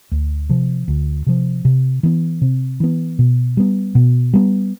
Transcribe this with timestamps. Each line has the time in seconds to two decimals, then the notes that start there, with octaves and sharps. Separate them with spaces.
0.11 D2
0.49 C3 F3
0.88 D2
1.27 C3 F3
1.65 C3
2.03 E3 B3
2.41 C3
2.80 E3 B3
3.19 B2
3.57 G3 B3
3.95 B2
4.33 G3 B3